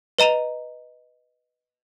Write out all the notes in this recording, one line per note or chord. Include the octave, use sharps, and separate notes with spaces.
B4 D#5 A#5 D#7 F7